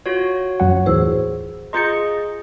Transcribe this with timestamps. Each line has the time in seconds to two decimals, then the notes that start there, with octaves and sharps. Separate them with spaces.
0.06 F4 F#4 C#5
0.60 F#2 F#3 F#5
0.86 D#2 A2 E3 G#4 C5 E6
1.73 F4 G#4 D#5 A#5 C6 G6 A6 C#7